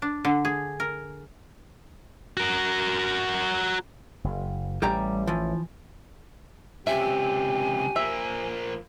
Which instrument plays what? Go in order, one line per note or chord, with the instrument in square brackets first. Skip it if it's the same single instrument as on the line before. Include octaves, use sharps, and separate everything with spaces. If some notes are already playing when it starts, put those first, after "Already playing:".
[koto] D4
D3
G#4
A#4
[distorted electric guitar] F#4 A#4
[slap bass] F#1
[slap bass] A1 [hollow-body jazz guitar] G3 G4 A#5
[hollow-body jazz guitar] E3 F3
[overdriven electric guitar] C#2 C3 [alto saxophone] G4 [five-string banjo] E5 [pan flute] G#5
[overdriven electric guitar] F3 A#3 [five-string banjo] E5